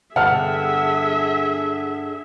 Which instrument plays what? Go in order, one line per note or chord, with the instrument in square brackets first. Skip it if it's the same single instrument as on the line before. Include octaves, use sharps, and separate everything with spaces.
[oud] G2 D3 B3 [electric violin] G#4 E5 [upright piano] F#5 A5 F6